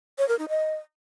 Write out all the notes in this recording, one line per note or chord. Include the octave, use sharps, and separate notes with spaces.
C#5
A#4
D#4
D#5